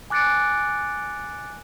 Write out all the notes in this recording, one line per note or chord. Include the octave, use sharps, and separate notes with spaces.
G#5 D6 F#6 A6 C#7 D7